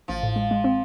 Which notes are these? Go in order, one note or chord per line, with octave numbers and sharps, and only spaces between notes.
A1 F3
A2
G#3
G#3
C4